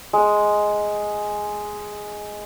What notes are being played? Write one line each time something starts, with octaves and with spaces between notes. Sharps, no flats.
G#3 D#6